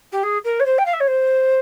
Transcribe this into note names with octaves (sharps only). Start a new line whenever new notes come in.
G4
G#4
A#4
C#5
C5
G5
F5
E5
C#5
C5